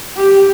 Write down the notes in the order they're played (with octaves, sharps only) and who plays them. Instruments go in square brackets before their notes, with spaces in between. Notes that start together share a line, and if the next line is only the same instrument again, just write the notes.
[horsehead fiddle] G4